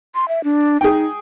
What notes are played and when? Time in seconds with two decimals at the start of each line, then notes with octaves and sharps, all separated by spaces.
0.15 C6
0.28 E5
0.44 D4
0.81 D#4 G#4 G5